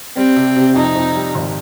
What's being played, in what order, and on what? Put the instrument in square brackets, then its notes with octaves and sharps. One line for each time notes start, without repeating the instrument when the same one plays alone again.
[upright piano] G3 [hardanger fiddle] C4
[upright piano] C3
C3
[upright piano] F2 [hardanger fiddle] D#4
[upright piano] F2
G3
G#1